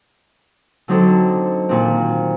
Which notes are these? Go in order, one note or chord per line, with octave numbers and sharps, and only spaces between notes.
D3 F#3 C4 D#4 A4
A#2 D#3 C4